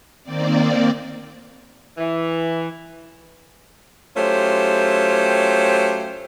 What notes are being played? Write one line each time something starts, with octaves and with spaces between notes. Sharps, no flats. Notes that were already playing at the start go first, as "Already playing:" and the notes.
D#3 A#3 C4 D5
E3
F#3 A3 C#4 F4 G4 C5